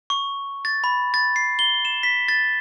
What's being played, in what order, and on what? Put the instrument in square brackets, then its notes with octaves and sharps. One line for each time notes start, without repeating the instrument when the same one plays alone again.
[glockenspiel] C#6
A6
B5
A6
C7
G7
E7
B6
A6